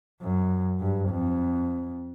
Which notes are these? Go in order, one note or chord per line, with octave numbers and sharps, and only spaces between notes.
F#2
G2
F2